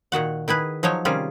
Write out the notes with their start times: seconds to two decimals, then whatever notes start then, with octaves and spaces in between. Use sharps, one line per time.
0.12 A#2 D#3 F#4 F#5
0.48 D#3 E4 G#4 B4
0.83 F3 F#3 D#4 C#5
1.05 C3 D#3 G3 C#4 F4 G#4